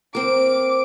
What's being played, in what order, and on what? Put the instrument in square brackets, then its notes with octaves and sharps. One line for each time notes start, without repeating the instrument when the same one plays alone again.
[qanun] C4 A#4 [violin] D6 D7